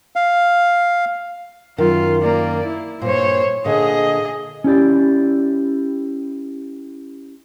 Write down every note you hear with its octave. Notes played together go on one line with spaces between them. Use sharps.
F5
F#2 D#3 F4
A#3 D5
E4
G2 A#2 C5 C#5
A#2 D3 G#4 D#5
C#4 E4 G4 D5